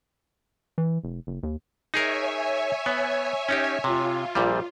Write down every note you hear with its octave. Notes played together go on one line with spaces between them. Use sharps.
E3
F1
F#1
D#2
D#4 G#4 A#4 C#5 E5 G#5
B3
C#4 D#4 G4
C3 F4
A#1 A#2 G3